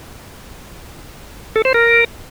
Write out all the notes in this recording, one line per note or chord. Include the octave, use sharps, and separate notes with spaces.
A4
C5
A#4